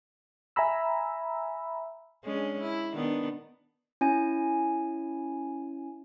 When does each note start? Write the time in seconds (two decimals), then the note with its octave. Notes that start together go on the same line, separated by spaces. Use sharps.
0.56 E5 G#5 A#5 B5 E6
2.24 G#3 C#4 D4
2.61 E4
2.94 D#3 B3 D4
4.01 C#4 E4 G#5